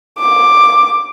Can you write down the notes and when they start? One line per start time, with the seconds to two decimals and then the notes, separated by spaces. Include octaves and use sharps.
0.18 D6